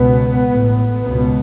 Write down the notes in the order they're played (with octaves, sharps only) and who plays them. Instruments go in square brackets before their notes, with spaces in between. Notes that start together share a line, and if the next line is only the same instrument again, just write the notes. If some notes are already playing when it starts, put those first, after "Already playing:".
Already playing: [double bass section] C#2 B2 B3
A1 A2
C#2 B2 B3